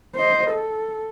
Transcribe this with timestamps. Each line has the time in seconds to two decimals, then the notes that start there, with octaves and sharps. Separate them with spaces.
0.15 C5 D#5
0.50 A4